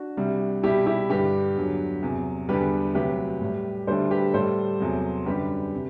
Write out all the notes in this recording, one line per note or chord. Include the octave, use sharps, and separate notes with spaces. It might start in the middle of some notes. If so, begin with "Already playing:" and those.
Already playing: D4 F#4
C2 C3 G3
C2 B2 G3 E4 G4
E4 G4
G2 D3 G3 G4 B4
E2 D3 F#3
E2 C3 F#3
E2 D3 G3 G4 B4
D2 C3 F#3 G4 B4
A2 G3
D2 D3 G3 A4 C5
G4 B4
A2 G3 A4 C5
E2 C3 F#3
F#2 D3 G3 G4 B4
C3